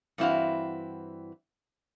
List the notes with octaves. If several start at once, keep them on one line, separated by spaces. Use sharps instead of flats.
G2 E3 C4 E4 F#4 F5